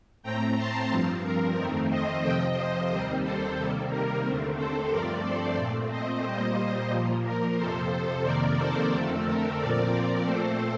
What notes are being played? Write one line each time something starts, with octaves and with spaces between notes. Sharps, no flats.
A2 A3 C4 G5 A#5
A5 C6
G2 F3 C4
A#4
F2 D#3 A3 C4 A#4
C5 D#5
F2 C3 F3 D#5 G5
C5 D#5
D#2 D#3 G3 C4 C5 D#5
A4 C5
C3 D#3 G3 A#3 A4
A#4
D#2 D3 A3 C4
A4 C5
G2 F3 A3 C4 A#4 D5
A4 C5
A#2 A3 C4
C5 D#5
A#2 G3 A#3 C5 D#5
A#2 F3 A#3
A#4
F2 C3 F3 A4 C5
A4 C5
F2 C3 D#3 A#3 A#4 D5
A4 C5
F2 D3 A3 C4 A4
A#4
A#2 F3 C4 A#4 D5
A#2 A3 C4 A4 C5